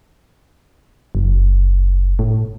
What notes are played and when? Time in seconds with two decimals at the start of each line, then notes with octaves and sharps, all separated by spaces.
1.15 F#1
2.19 A2